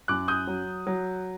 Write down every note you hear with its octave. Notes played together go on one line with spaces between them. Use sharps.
F#2 D6 F#6
D#6 G6
F#3
F#3